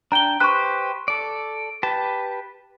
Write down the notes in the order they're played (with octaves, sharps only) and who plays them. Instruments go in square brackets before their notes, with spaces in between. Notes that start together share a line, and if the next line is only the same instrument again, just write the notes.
[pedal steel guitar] D4 G5 [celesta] A#5 G7
[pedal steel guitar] G4 B4 C5 [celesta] C#6 F#6
[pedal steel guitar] A4 D5
G4 B4 A5